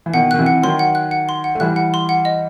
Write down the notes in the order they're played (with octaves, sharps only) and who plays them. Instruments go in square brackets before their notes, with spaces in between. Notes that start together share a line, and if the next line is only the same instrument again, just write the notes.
[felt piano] E3
[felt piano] B2 D#3 [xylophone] F#5
[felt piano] D#3 [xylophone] F#6
[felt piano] C3 E3
[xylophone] F#5
[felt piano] D#3 F#3 [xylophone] C6
[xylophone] F#5
F#6
F#5
C6
F#5
[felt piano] A3
[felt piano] E3 G3 [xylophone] F#6
[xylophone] F#5
C6
F#5
D#5